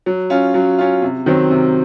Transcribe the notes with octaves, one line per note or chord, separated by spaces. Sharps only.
F#3
C#4 F4
F#3
C#4 F4
C3
D#3 F#3 C4
C3